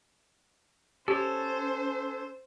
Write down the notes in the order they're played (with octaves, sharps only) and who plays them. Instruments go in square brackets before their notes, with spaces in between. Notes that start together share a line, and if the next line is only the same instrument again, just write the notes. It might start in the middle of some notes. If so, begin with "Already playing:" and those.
[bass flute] C#4 [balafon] G4 [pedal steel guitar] A4 C#5 [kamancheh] C5